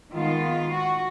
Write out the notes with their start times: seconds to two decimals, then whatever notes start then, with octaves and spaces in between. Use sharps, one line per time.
0.13 D#3 G#3 B3 F4
0.71 F#4